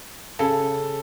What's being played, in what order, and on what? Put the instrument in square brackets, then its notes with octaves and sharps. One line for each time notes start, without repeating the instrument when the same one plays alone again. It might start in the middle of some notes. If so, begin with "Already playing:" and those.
[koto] C#3 [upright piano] A4